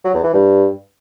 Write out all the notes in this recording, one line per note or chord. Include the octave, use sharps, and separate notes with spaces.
F#3
E2
E3
G2